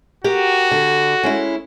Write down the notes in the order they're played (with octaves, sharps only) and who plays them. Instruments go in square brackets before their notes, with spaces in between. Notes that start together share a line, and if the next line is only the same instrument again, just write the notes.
[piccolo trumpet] F#4 [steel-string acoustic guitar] G4 A#4
[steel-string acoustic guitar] D3
G#3 C#4 E4